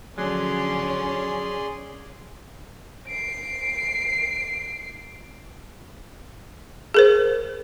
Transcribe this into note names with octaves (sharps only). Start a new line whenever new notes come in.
D3 F3 F#3 C#4 G#4 D5 C6
C7 D7
G#4 A#4 C5